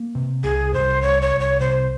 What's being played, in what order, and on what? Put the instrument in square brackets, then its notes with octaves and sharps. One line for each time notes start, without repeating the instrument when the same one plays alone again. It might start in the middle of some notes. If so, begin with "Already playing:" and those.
Already playing: [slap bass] A#3
C3
[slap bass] C2 [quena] G#4
[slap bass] C2 [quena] C5
[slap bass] C2 [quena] C#5
[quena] C#5
[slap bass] C2
[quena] C#5
[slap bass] C3 [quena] C5